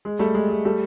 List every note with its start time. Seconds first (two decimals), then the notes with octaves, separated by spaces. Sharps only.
0.05 G#3
0.19 G3 A3
0.35 G#3
0.49 G#3
0.65 G3 A3